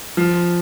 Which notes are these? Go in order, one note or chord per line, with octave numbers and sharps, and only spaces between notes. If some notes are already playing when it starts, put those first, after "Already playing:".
F3